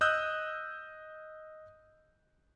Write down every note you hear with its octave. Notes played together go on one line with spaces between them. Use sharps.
D#5 D#6 E6 F#6 G6